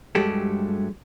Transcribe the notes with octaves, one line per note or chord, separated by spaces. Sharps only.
G2 F#3 G#3 A3 G4 A4